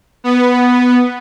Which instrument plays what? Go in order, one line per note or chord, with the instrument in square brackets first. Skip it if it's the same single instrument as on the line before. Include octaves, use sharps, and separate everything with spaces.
[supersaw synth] B3